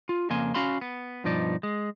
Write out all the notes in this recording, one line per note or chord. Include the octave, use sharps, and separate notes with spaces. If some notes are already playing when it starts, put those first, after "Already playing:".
F4
F2 C#3 A#3 G#5 C6
C#4 F#4 F5 B5 C6
B3
G2 B2 F3 D#4 D5
G#3